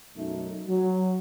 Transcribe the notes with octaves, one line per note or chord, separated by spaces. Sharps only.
B1 F#2 A3 D#4
F#3